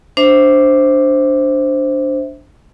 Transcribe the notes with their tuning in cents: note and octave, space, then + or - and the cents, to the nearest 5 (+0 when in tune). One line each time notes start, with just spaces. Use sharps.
D4 +0 C5 +0 E5 -10